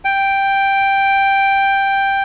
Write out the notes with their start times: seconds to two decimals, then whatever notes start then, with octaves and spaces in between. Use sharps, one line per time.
0.05 G5